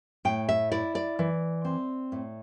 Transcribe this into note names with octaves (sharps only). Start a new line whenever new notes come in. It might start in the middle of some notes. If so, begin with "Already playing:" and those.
A2 G5
E5
E4 D5
D5
E3
C4
A2